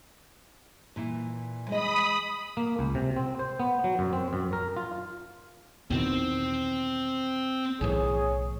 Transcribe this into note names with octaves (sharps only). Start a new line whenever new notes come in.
A#2 E3
G#3 D#5 B5 D#6
A#3
C#2
C3
C4
C5
B3
F#3
F#2
C4
F#2
A#4
F4
E2 B2 D#3 C4
B1 A2 E3 G#4 C#5